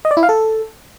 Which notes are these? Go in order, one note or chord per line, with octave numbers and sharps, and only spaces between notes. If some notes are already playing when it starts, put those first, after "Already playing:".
D#5
D5
E4
F5
A4